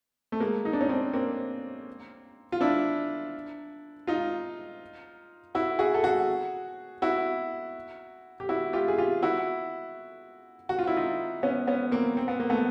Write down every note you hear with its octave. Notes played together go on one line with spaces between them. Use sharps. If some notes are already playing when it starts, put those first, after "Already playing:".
A3
G#3 A#3
D#4
D4
C#4 D#4
C4 D4
A#3 C4
F4
D4 E4
D#4 F4
E4 F#4
F#4 G#4
A4
F#4 G#4
E4 F#4
G4
E4 F#4
F4 G4
G#4
F4 G4
E4 F#4
F#4
F4
E4
D#4 F4
B3 C#4
B3 C#4
A#3 C4
C4
B3
A#3
A3 B3